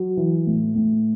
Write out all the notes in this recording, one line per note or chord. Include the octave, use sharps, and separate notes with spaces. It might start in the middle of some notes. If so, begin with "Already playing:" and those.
Already playing: F#3
E3
A2
A2